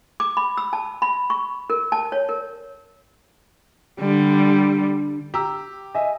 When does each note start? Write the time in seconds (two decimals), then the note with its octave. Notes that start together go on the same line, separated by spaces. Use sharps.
0.20 D6
0.37 B5
0.57 E6
0.73 A5
1.02 B5
1.30 C#6
1.70 A#4
1.92 A5
2.12 C#5
2.29 A#4
4.00 D3 G3
5.34 G4 A#5 E6
5.95 D#5 E5 G#5